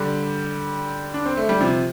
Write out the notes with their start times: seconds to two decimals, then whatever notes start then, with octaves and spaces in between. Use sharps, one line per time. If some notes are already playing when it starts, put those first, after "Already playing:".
Already playing: D3 G3
1.14 D4
1.26 C4
1.37 A3
1.49 G3
1.61 C3 F3